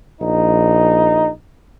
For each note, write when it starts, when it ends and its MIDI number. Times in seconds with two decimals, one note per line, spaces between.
0.21 1.31 34
0.21 1.30 63